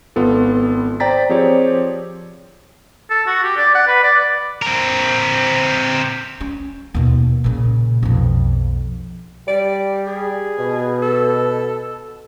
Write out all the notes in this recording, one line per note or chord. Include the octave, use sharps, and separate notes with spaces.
G#1 B3 F4 A4
C5 D5 G5 A#5 A6 B6
F3 C4 G4 G#4 C#5 D5
A4
F#4
G4
D5
F#5
B4
D5
C4 A#4
C#4
D#2 B2
A#2 C#3
B1 F2
G3 D5
G#4
B2
A4